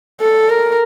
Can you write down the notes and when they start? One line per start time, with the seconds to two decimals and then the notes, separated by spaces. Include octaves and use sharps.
0.21 A4
0.50 A#4